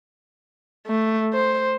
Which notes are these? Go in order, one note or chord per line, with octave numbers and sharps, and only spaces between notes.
A3
C5